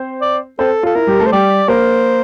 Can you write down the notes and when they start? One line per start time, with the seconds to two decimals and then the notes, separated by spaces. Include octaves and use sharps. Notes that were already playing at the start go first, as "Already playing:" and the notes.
Already playing: C4 C5
0.22 D5
0.59 C4 A4 C5
0.83 F4 A4
0.95 E4 A#4
1.07 G3 G4
1.20 A3 A4
1.26 C5
1.32 G3 G4 D5
1.68 A#3 A#4 C5